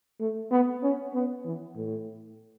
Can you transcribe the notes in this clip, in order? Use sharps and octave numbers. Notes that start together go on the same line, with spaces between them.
A3
B3
C#4
B3
E3
A2